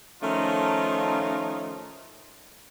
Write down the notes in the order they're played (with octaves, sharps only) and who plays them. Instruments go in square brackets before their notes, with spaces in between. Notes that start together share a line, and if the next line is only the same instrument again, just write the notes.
[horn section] D#3 F3 A3 C#4 D#4 F4